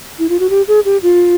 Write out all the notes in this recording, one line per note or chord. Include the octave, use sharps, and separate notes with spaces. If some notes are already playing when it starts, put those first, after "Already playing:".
E4
F4
F#4
G4
G#4
G4
F4